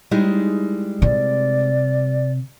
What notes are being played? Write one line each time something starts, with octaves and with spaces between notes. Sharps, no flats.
G3 G#3 D#4 E4
C3 D5